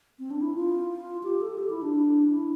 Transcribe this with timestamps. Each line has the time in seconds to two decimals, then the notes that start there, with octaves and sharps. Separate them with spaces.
0.19 C4
0.31 D4
0.42 E4
0.54 F4
1.23 G4
1.42 A4
1.58 G4
1.70 E4
1.82 D4
2.29 E4